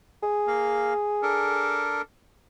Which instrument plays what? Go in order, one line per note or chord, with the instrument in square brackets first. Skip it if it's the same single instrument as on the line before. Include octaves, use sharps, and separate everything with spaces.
[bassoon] G#4
[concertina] A#3 F5
D4 A4 A#4